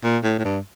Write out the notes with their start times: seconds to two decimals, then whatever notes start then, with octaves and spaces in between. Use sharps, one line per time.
0.03 A#2
0.23 A2
0.39 A2
0.45 G2